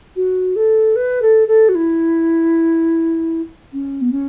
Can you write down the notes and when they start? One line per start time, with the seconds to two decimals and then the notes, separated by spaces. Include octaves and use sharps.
0.15 F#4
0.55 A4
0.95 B4
1.21 A4
1.47 A4
1.68 F#4
1.74 E4
3.72 C#4
4.01 B3
4.11 C#4